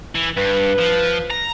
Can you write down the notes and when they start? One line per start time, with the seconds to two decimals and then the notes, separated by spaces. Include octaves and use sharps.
0.15 E3
0.37 G2 B4
0.78 F3
1.30 A#5